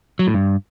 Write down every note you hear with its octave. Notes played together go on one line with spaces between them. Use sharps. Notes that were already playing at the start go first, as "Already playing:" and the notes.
F#3
A2
G2